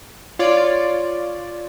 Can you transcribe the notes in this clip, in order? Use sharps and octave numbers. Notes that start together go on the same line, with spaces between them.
F4 C#5 D5